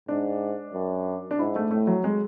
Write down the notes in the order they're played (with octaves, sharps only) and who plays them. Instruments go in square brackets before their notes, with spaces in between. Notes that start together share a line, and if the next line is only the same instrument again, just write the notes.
[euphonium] G#2 [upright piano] D4
[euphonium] F#2
[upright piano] D4
[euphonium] G#2 [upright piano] E4
[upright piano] A3
[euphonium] A2 [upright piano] A3
[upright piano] F#3
G#3